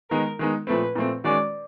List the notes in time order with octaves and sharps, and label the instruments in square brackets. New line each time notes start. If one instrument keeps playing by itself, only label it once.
[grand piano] D#3 G#3 B3 D#4 [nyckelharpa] A#4
[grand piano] D#3 G#3 B3 D#4
[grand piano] A#2 F3 A3 C4 [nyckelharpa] B4
[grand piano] A#2 F3 A3 C4
[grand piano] D#3 G#3 C#4 F#4 [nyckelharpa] D5